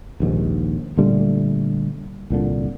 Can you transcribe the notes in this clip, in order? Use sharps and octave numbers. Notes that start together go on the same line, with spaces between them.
A#1 D#2 G#2
A#2 D3 G3 A3
C2 A#2 D3